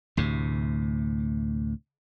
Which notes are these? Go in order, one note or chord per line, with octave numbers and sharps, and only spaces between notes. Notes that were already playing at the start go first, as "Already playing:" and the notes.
D2 A2 C3